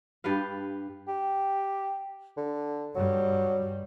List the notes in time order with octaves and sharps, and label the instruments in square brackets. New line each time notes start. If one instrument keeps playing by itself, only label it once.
[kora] G2 G4 B4 F5
[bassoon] G4
D3
[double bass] G2 G3 [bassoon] F#3